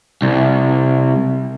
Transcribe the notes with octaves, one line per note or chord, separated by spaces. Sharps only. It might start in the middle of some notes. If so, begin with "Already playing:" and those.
C2